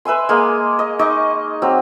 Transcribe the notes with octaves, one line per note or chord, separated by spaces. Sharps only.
B4 E5 G#5 C6
G#3 A#3 D#5
D#5
D#4 D#5 C#6 D6
F#3 C4